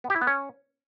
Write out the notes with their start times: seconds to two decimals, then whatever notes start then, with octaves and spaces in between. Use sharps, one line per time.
0.04 B3
0.10 G4
0.16 E4
0.21 B3
0.27 C#4